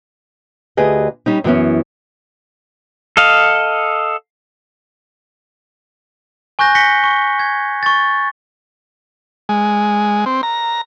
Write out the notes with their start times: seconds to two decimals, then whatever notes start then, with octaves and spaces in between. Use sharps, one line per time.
0.77 D2 G4 G#4 B4 D#5
1.26 G3 C#4 D#4
1.44 F#2 E3 B3 C#4
3.17 A4 D#5 F5
6.59 G#5 C#6 F#6 G6 A#6
6.75 A#6 B6 C#7 G7
7.04 C#6
7.39 G#6
7.83 C#6 A6
9.49 G#3
10.26 C4
10.43 A#5